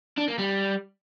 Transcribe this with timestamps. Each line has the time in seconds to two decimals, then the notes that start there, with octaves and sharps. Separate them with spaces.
0.17 D4
0.28 A#3
0.38 G3